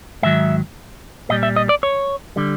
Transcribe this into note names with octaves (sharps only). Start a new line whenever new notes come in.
G#2 D#3 F#3 E5
A#2 G3 D#5
E5
D#5
D5
C#5
D3 G3